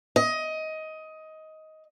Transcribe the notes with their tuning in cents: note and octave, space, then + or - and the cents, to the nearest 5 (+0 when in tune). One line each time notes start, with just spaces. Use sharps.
D#5 +15